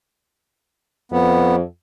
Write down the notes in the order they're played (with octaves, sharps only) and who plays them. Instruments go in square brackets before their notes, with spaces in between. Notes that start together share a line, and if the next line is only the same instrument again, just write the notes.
[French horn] F2 [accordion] B3